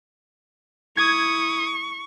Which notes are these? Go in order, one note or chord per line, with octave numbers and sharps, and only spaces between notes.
E4 C#6 D#6 G#6